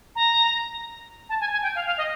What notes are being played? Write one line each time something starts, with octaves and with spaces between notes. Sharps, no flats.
A#5
A5
G#5
G#5
G5
F5
F5
D#5